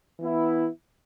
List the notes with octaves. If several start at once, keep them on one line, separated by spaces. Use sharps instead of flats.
E3 B3 E4